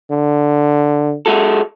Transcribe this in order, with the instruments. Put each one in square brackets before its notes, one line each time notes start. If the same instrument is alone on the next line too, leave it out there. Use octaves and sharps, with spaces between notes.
[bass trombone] D3
[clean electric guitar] G#3 F#4 A4